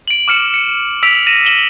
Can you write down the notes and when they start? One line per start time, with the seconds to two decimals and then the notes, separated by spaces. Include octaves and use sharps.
0.08 D7 F#7
0.28 D6 F6 C#7 E7
0.54 C#7
1.03 E6 B6 D7 F7
1.27 A#6 D#7 E7
1.45 E7 F#7 G7